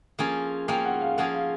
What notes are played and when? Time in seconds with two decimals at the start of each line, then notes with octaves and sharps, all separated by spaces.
0.19 F3 A#3 C#4 F4 G#4 G#5
0.68 F3 A#3 C#4 F4 G#4 G5
0.85 F#5
1.01 F5
1.17 F3 A#3 C#4 F4 G#4 F#5
1.34 F5